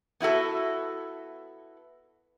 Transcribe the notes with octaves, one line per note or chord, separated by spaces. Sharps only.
B3 E4 F#4 A4